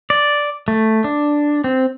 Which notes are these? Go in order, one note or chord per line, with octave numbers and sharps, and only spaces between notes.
D5
A3
D4
C4